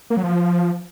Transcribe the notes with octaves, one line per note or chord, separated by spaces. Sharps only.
A#3
F#3
F3